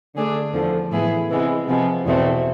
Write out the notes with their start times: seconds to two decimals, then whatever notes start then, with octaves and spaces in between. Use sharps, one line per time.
0.16 D3 A3 D4 G#4
0.53 E2 D3 F3
0.91 A2 E3 B3 E4 G#4
1.30 C3 E3 G#3 B3
1.68 C3 F3 G#3 B3
2.06 E2 B2 A3 C4